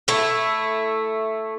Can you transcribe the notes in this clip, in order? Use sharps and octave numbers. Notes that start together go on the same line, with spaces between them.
A3 E4